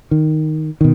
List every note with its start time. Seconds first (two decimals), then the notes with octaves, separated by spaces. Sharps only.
0.11 D#3
0.81 B2 D#3